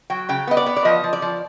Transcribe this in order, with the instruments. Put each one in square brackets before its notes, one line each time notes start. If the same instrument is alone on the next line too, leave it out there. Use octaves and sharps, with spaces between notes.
[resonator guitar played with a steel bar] F#3 G5
C#3 G5
B3 D#5
D5
B3
D5
F3 D#5
F3
D5
F3